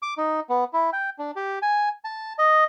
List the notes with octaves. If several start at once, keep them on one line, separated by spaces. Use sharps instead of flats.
D6
D#4
B3
E4
G5
D4
G4
G#5
A5
D#5